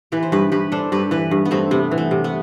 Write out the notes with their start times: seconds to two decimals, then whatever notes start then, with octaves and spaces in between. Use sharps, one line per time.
0.12 E3 G4 B4
0.23 C5
0.32 G2 G4 B4
0.52 G2 G4 B4
0.72 D4 A4 C5
0.92 G2 G4 B4
1.11 E3 G4 B4
1.31 G2
1.45 B3
1.51 G2 A3 C4
1.71 C3 B3
1.91 E3
1.98 A3
2.11 C3
2.24 B3